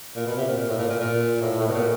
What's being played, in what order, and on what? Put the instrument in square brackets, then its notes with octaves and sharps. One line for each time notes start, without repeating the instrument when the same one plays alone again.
[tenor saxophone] A#2
B2
C3
A#2
A#2
A2
A#2
A#2
A#2
A2
A2
B2
A#2